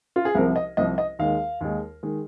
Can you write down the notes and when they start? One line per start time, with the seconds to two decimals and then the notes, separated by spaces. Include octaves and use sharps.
0.16 F4
0.25 G#4
0.35 C2 C3 F3 A#4
0.56 D#5
0.77 C2 C3 F3 D#5
0.98 D#5
1.19 D#2 D#3 G#3 F5
1.61 D#2 D#3 G#3
2.03 D#3 G#3